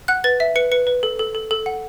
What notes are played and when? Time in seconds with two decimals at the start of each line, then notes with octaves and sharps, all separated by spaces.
0.08 F#5 F#6
0.24 B4 A6
0.40 E5 B6
0.56 B4 C#7
0.72 B4 C#7
0.87 B4
1.03 A4
1.19 A4
1.35 A4
1.51 A4
1.66 F#5